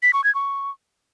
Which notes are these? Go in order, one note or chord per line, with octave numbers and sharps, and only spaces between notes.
B6
C#6
G#6
C#6